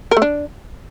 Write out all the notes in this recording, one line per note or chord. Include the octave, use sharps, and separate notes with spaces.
A#4
A3
D4